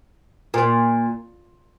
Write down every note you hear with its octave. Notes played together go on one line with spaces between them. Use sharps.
A#2